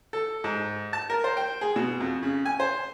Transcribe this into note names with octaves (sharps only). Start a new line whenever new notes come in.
A4
G#2
A5
A#4
C5
G5
G#4
B2
F2
C#3
G#5
C5